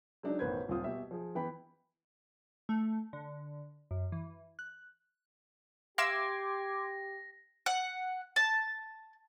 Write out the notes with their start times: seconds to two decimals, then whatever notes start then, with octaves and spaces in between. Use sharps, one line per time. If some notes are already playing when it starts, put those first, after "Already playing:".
0.23 F#3 G#3 D4 D#4
0.39 A1 B2 D#3 B4 C5 G#6
0.68 D#1 C4 F4 D#6
0.84 B2 G4 E5
1.11 F3 G#4
1.35 E3 B3 G5 B5
2.69 A3
3.13 D3
3.91 F#2
4.12 E3
4.59 F#6
5.98 G4 E5 F5 C6 D6 E6 G#6 A#6
7.66 F#5
8.36 A5